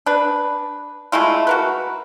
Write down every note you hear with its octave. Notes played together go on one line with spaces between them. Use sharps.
D4 B4
G#3 A3 E4 F4
F#4 A#4 B4